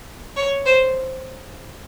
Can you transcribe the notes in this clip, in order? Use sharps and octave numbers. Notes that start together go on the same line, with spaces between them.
C#5
C5